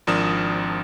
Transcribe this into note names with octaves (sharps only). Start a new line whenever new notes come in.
G#1 F3 D4 A#4 D#6 E7